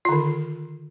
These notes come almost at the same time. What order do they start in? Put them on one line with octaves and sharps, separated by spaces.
F4 D3 D#3